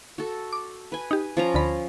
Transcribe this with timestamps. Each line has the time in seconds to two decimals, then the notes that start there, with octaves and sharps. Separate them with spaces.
0.18 F#4 A4
0.53 D6
0.92 B4 G#5
1.11 D#4 G4
1.37 F3 C#4 A#5
1.54 D2 D3 B5